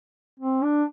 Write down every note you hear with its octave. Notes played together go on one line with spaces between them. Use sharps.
C4
D4